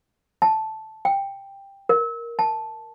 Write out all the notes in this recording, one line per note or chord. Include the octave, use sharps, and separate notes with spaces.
A5
G5
A#4
A5